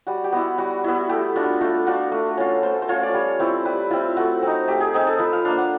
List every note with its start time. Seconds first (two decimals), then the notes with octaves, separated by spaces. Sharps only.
0.07 G3 F#4
0.24 G4
0.32 B3 E4 F#4
0.58 G3 F#4
0.84 B3 E4
1.09 A3 G4
1.36 D4 F4 F#4
1.61 A3 F4
1.87 D4 F4 F#4
2.12 A3
2.37 C#4 F4
2.63 A3 C5
2.82 C5
2.89 C#4 F4 C#5
3.03 D5
3.14 G3 C#5
3.39 C4 E4 C5
3.65 G3 B4
3.91 C4 E4 F4
4.17 A3 F#4
4.43 C4 D#4
4.68 A3 G4
4.80 G#4
4.94 C4 D#4 G#4
5.07 A4
5.19 F3 B4
5.33 F5
5.45 A#3 D4 F5
5.58 F#5